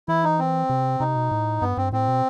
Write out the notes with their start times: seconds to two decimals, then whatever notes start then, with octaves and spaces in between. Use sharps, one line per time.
0.08 E3 E4
0.24 D#4
0.39 C4
0.70 C3
1.00 C3 D#4
1.16 B2
1.31 A2
1.61 G2 B3
1.77 G2 C4
1.93 A2 C4
2.08 B2